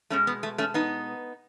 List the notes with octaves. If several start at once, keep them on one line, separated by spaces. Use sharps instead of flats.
B2 G#3 A3 C#4
B3
A3
A3 C#4
B3 D#4